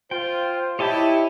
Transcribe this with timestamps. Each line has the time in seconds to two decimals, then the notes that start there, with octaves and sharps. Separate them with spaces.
0.11 F4 C5 G5
0.79 E4 G4 C#5 D#5 A5